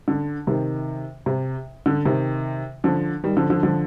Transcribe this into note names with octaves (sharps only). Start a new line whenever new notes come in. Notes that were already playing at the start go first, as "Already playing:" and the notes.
D3
C3 D#3
C3
D3
C3 D#3
D3 F3
D#3 G3
D3 F3
D3 F3
D3 F3